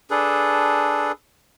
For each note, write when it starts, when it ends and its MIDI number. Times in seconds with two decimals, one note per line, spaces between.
0.10 1.12 62
0.10 1.12 68
0.10 1.12 69
0.10 1.12 71